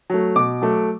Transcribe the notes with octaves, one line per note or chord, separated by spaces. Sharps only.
F#3 A3
B2 D6
F#3 A3